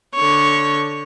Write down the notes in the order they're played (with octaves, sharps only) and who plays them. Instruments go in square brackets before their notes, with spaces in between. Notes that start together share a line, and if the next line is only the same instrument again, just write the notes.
[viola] D3 C#5